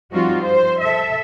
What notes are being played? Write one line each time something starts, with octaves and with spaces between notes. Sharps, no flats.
F3 G3 C4 D#4 F4 F#4
C5
A4 E5